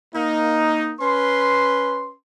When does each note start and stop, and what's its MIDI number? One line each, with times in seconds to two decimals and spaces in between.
0.14 0.94 58
0.14 0.94 63
1.01 2.12 61
1.01 2.12 71
1.01 2.12 84